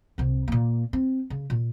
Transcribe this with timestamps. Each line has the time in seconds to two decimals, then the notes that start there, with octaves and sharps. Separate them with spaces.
0.18 C2 C3
0.48 A#2 A#3
0.93 C4
1.30 C#3
1.50 A#2